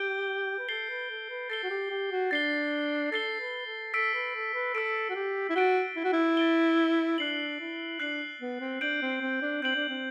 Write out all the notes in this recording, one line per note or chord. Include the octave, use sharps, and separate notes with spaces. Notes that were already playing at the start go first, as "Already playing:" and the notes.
Already playing: G4 G6 D7 G7
B4
A4 A6 C7 G7
B4
A4
B4
A4 A6 C7 G7
F#4
G4
G4
F#4
D4 A6 C7 G7
A4 A6 C7 G7
B4
A4
A4 E6 B6 D7
B4
A4
B4
A4 E6 B6 D7
F#4
G4
E4
F#4 A6 D7 G7
E4
F#4
E4
A6 D7 G7
D4 F#6 C7 F#7
E4
D4 F#6 C7 F#7
B3
C4
D4 G6 D7 F#7
C4
C4
D4
C4 G6 D7 F#7
D4
C4